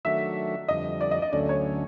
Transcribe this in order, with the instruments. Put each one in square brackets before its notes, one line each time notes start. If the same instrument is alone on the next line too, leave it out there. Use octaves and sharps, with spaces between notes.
[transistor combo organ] D#3 F#3 A3 D4 F#4 [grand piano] E5
[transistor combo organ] F2 D3 G3 [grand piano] D#5
[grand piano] D5
D#5
D#5
[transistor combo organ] D2 D3 F#3 A3 C#4 [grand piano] D5
[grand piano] C#5